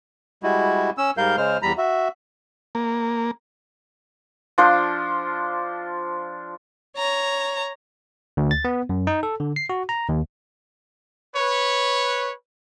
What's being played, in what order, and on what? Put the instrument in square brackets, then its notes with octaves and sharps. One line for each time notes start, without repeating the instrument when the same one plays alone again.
[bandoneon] G3 G#3 E4 F#4
C#4 E6
G#2 G3 A#4 F5 G6
C#3 G#3 C5 F6
E2 G3 A#5 B5
F#4 E5
[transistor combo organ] A#3
[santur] F3 D4 C5
[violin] C#5 A#5
[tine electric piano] D2
A6
B3
F#2
D#4
A4
D3
C7
F#4
A#5
D#2
[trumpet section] B4 C#5